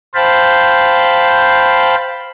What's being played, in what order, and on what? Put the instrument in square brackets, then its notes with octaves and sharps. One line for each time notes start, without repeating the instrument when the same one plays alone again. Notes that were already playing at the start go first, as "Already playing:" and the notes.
[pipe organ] C5 F5 G5 A5 B5